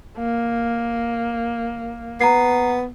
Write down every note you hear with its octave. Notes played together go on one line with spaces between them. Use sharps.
A#3
B3 A#5 C7